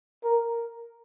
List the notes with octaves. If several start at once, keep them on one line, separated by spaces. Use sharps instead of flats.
A#4